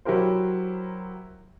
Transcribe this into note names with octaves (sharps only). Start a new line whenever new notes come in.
F#3 E4 G4 A#4 C5